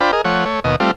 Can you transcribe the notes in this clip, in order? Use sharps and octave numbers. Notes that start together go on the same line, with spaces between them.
D4 F4 C5 G5 B5
G#4 A#4 D#5
F3 A3 C#5 F#5
A3 C#5
D#2 B2 D#5
G3 A3 C4 F4